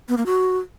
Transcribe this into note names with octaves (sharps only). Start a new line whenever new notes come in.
B3
A#3
F#4